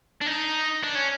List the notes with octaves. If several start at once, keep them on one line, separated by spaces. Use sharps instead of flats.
D4
D#4
D4
C#4